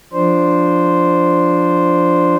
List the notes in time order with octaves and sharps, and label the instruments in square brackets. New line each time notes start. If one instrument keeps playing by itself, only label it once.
[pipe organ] F3 D4 C5